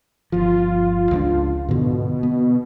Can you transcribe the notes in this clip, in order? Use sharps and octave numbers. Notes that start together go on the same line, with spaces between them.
G1 F3 F4
C#2 F#3 D4
G#2 B2 D3
B3